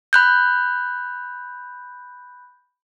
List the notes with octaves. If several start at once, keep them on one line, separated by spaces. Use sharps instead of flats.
B5 F#6 G6